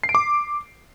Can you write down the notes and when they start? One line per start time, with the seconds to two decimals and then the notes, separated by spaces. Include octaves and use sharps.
0.03 C7
0.09 D7
0.15 D6